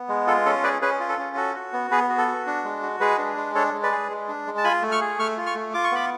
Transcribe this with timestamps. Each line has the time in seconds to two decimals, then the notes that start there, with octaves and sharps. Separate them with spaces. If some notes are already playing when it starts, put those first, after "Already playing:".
Already playing: B3
0.09 G#3
0.27 F4 A4
0.46 C#4 A4
0.63 G#4 B4 D5
0.82 C#4 G#4 B4
1.00 F4
1.09 A4
1.18 C#4
1.36 F#4 A4
1.55 F#4
1.73 B3
1.91 B3 G#4 B4
2.09 F#4
2.18 A4
2.28 F#4
2.46 D4
2.64 G#3
2.82 F#4
3.00 G#3 G#4 B4
3.18 D4
3.37 G#3
3.55 D4 A4 C#5
3.74 G#3
3.83 B4 D5
3.91 G#4
4.10 G#3
4.28 D4
4.47 G#3
4.58 A5
4.64 F4 G#5 B5
4.82 A3
4.92 C#6 F6
5.00 G#4
5.19 A3 C#6 F6
5.37 F4
5.46 C#6 F6
5.55 A3
5.74 F4 D6
5.84 C#6
5.92 B3 B5 D6